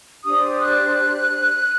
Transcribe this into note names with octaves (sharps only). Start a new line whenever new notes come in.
D4 G4 C5 D#6
F#6